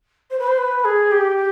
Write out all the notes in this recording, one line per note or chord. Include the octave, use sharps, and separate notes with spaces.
C5
B4
C5
B4
G#4
G4